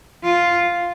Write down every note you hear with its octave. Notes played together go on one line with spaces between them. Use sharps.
F4